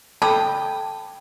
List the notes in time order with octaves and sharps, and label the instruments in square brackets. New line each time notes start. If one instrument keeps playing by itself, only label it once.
[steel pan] A4 D#6 [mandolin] G5 [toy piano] A5 [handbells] B5 D6 G#6